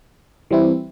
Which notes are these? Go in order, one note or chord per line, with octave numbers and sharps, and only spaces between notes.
E3 G3 C4 E4